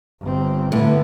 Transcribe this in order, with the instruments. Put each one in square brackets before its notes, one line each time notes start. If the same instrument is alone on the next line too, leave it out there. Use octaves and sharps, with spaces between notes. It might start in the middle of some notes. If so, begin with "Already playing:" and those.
[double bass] G1 C4
[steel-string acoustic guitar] A2 [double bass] D3 B3